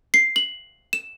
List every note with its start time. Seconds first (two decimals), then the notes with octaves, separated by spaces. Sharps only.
0.14 C7
0.36 F#7
0.93 E7